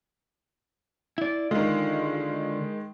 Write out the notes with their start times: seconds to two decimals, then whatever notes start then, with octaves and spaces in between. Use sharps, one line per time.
1.18 E4 D5
1.51 D3 D#3 G#3 F4